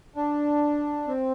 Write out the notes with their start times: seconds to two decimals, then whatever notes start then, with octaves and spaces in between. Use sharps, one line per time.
0.16 D4
1.07 C4